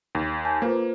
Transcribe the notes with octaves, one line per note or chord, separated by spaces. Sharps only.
D#2
G#5 A5 G6
A#3 F4 B4 C5